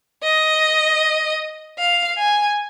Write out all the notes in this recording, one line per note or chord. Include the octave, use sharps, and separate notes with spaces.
D#5
F5
G#5